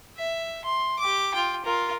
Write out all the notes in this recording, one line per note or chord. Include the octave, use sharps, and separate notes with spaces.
E5
C6
G4 D6
F4 G5
F4 A#4